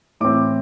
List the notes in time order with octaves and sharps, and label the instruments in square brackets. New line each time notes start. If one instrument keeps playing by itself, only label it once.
[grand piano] A2 E3 C4 D6